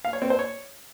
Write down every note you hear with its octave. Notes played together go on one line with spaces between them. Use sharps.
F5
C#5
C4
C5
C#5